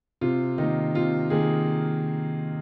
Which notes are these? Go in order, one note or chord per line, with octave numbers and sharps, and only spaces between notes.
C3 F4
D#3 A#3 D#4
C3 F4
D#3 A#3 G#4